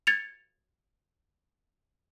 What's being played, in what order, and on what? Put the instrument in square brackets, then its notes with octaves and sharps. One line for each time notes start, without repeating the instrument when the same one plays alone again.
[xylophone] G#6 A6 C#7 F7